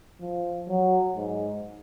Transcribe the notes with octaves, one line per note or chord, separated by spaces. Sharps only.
F3
F#3
G#2